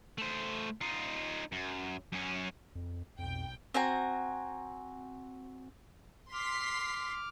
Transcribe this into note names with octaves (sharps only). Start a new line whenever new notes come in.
A3 C5
D#4 F4
F#2
F#2 C#4
F2
B1 F2 G5
C4 F#4 G#5 A#5
C6 D6 F6 B6 C7